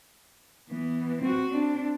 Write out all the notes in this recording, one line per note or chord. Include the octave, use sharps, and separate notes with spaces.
E3 B3
C4 F#4
C4 D4